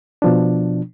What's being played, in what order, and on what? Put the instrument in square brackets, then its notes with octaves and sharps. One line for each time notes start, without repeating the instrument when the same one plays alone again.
[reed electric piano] B2 F3 D4